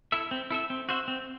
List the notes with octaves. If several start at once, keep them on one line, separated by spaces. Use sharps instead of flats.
E4 A4 E5
C4
E4 A4 E5
C4
F#4 C5 E5
C4